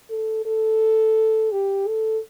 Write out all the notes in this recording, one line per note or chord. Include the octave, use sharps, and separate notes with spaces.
A4
A4
G4
A4